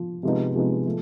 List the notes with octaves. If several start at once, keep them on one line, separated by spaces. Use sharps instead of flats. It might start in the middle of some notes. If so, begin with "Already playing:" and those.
Already playing: F3
C3 F3 G#3 B3 D#4
C3 F3 G#3 B3 D#4
F3 A3